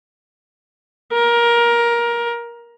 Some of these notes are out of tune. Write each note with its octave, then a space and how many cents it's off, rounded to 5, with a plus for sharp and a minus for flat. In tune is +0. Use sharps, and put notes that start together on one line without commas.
A#4 +20